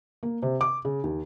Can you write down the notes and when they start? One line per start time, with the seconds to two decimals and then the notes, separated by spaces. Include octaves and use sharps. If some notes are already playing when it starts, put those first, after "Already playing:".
0.23 A#3
0.42 C3
0.61 D6
0.85 C#3
1.04 D#2